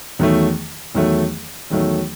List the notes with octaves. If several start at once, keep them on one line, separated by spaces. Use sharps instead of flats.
E2 D#3 F#3 A3
E2 D#3 F#3 A3
E2 D#3 F#3 A3